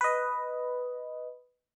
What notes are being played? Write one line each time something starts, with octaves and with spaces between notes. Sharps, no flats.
B4 D#5